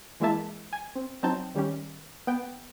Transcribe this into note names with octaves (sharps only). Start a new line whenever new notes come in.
E3 G#3 A#3 E4 E5 A5
G#5
C4
F#3 C4 D#4 A5 G6
D#3 G3 C#4 G4
B3 G5